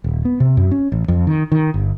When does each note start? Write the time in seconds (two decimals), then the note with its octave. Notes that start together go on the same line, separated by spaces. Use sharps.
0.04 D#1
0.25 B3
0.40 C3
0.57 F#2
0.71 C#4
0.92 A1
1.08 F2
1.27 D#3
1.52 D#3
1.74 G1